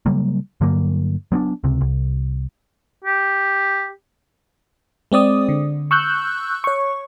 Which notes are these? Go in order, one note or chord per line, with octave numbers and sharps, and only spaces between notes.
C#3 F#3 G3 A#3
G2 D3 F#3 A#3
F#3 B3 C4 D4
C#2 C3
C2
G4
G#3 C4 D5 D#6
D3
C#6 E6 F#6 G6
C#5 C#6